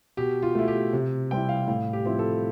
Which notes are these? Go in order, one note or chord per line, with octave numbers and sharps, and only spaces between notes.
B2 G4
F4
A3 E4
G4
C3
G3 C4 E4 G5
F5
A2 F5
G4
F3 C4 E4
A4